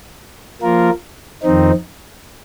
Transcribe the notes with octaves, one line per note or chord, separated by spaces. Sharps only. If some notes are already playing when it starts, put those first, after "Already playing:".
F3 A#3 F4 A#4
F2 D#3 C4 D#4